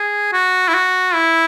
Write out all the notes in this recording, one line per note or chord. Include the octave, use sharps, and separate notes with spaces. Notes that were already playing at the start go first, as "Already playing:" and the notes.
Already playing: G#4
F#4
E4
F#4
E4